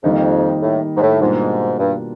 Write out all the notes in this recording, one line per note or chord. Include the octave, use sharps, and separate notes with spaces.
F2 D#3 G3 A#3 D#4
A2
G#2
A2
G#2 B2 G3 A#3 D4 F4
G2